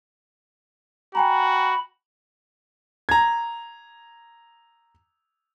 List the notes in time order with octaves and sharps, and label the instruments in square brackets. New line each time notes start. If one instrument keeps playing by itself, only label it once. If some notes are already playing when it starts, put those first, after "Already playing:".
[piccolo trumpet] F#4 [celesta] G5 G#5 A#5 [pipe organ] B5
[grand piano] A#5 G#6